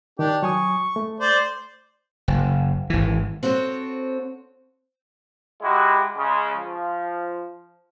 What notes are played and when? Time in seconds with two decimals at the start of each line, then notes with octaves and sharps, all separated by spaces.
0.19 D#3 D4 G4
0.43 F#3 G#5 C#6 D#6
0.96 A3
1.20 C5 D5
2.28 F#1
2.90 G#1 E3
3.43 C4 F#4 A4 C#5
5.62 G#3 E4 F#4 G4
6.17 C#3 G#3
6.56 F3